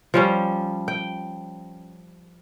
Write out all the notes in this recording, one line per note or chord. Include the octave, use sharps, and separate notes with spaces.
F3 G3 C#4
G5